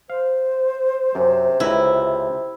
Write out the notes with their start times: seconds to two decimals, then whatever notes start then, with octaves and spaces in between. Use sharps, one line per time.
0.10 C5 F5
1.15 F#2 C3
1.60 C#2 E4 B4 A#5